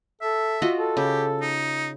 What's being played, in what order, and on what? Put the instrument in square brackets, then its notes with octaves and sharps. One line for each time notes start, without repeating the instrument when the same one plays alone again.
[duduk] A4 [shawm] E5
[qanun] F4 F#4 D#5
[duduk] A4
[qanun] C#3 [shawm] G4
[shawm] D#4